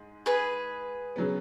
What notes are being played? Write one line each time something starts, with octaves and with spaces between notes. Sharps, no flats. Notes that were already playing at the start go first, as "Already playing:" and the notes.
Already playing: G#2 G#3
G#4 B4
C#3 F#3 B3